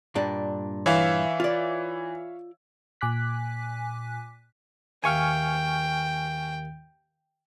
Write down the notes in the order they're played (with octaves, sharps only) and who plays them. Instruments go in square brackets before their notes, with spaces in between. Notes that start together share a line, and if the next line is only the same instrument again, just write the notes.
[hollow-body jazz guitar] G2 A#2 D4
[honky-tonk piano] E3 [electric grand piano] C#5 E5 F5
[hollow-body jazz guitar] F4 D5
[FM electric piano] A#2 G#5 D6 F#6 B6
[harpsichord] D#2 E5 F5 [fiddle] G5 [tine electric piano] G#5 C#6 F6